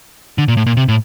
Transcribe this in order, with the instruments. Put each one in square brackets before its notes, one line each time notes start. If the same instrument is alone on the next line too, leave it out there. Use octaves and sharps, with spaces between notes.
[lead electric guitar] D3
A#2
A2
A#2
C3
A2